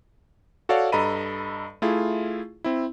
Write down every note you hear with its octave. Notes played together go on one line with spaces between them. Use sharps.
F#4 A4 C#5 D5 F5 F#5
G2 A4 D#5 A#5 B5 D#7
A3 E4 F4 G#4
C4 E4